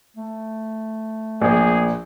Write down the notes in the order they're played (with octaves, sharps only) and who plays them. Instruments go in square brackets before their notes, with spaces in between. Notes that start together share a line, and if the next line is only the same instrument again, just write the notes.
[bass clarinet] A3
[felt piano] A#1 [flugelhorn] G#4